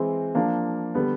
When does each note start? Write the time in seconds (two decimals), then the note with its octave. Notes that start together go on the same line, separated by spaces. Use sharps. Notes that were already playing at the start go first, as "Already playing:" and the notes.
Already playing: E3 G#3 C4
0.35 F3 A#3 D4
0.95 D3 G3 B3